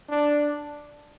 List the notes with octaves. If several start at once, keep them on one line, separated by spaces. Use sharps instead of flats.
D4